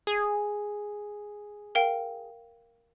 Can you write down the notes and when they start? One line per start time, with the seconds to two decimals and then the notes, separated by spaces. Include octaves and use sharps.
0.07 G#4
1.75 A#4 F5 G5